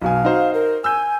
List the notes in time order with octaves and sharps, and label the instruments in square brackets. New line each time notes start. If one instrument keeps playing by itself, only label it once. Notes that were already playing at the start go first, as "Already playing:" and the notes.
[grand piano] B1 B2 G#5 [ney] F5
[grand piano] D#4 F#4 C5
[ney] A#4
[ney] G#5 [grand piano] E6 G6